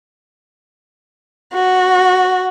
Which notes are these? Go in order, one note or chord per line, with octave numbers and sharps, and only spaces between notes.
F#4